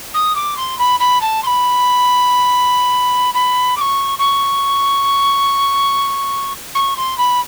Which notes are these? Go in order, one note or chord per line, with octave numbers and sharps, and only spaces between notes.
D#6
D6
C6
B5
B5
A5
C6
B5
B5
D6
C#6
C#6
C#6
C6
B5